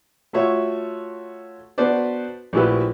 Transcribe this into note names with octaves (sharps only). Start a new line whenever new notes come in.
A3 F4 F#4 C#5 E5
B3 D4 F#4 B4 C5 D5
A#1 A3 E4 F#4 G4 B4